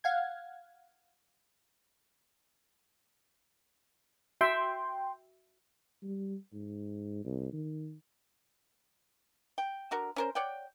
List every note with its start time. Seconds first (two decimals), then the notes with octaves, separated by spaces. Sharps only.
0.04 F5 F#5 G#6
4.41 F#4 E5 G5 C6
6.02 G3
6.53 G#2
7.24 C2
7.53 D#3
9.58 G5
9.91 D3 F#4 A#4
10.16 C#4 A#4 C5
10.35 C#5 D5 F#5 G5